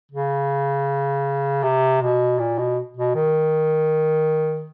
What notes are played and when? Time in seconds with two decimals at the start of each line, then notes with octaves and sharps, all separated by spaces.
0.12 C#3
1.63 C3
2.02 B2
2.39 A#2
2.58 B2
2.97 B2
3.15 D#3